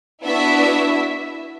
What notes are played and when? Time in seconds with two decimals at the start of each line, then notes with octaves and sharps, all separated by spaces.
0.24 B3 D4 E4 F#4 E5